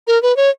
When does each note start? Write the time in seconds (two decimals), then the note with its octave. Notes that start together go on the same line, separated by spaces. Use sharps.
0.07 A#4
0.22 B4
0.37 C#5